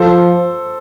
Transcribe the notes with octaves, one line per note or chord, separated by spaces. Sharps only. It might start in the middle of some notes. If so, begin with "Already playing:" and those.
Already playing: F3 A4 C5